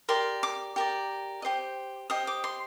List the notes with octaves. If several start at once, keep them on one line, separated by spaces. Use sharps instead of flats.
G4 A#4 D5 C6
D6
G4 A#4 D5
G4 C5 D#5
G4 C5 D#5 D#6
D6
C6